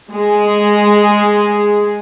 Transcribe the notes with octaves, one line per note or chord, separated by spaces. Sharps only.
G#3 G#4